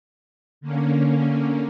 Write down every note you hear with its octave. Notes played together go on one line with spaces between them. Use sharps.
D3 A#3 C#4